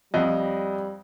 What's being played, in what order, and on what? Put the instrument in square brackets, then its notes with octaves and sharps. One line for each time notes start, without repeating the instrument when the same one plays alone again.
[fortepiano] F2 [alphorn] G3 [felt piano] D#5